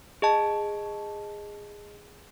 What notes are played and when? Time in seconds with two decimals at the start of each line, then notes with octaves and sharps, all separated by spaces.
0.22 G#4 D#5 A5